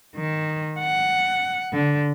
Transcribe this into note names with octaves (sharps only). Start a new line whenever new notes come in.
D#3
F#5
D3